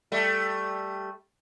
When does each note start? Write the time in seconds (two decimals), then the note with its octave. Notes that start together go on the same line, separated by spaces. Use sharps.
0.12 G3 A3